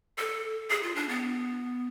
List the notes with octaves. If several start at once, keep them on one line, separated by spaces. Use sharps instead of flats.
A4
G#4
F4
D4
B3